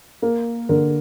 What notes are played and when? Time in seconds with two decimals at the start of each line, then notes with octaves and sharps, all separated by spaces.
0.22 A#3 A#4
0.69 D3 A#4